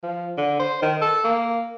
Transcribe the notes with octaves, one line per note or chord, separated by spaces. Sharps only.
F3
D3
C5
D#3
A4
A#3